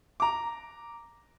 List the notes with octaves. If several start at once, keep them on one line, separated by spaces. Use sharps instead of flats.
A#5 D6